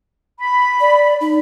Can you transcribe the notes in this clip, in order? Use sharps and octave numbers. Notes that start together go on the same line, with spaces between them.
B5
D5
D#4